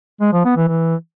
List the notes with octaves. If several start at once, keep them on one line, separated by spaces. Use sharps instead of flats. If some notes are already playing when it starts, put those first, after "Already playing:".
G#3
F3
B3
E3
E3